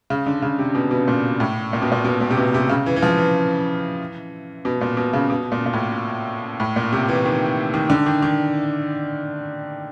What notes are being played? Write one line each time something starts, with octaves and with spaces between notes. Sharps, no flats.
C#3
D3
C#3
C3
B2
B2
A#2
A2
A#2
B2
A#2
B2
A#2
C3
B2
C3
C#3
E3
E3
F3
E3
B2
A#2
B2
C#3
B2
A#2
A#2
A2
A2
A#2
C3
E3
D#3
D#3
D3
D#3
D#3